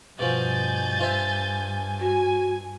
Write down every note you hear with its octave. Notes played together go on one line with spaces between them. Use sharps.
G2 B2 F3 G#5 G6 A6
F4 C5 E5
F#4 G#5